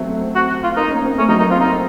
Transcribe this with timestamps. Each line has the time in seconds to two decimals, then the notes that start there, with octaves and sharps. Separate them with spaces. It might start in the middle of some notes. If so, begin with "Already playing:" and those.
Already playing: F#3 A3 C4
0.35 F#4
0.64 F4
0.77 A#3 D#4
0.91 C#4
1.05 C4
1.18 A3 C#4
1.29 F#3 D#4
1.40 A#3 D#4
1.50 C4 F4
1.61 D#4